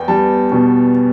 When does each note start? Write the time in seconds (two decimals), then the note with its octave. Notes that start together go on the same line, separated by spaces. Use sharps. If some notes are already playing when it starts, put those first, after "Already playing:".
Already playing: E2 B3 G5
0.08 G3 A5
0.52 B2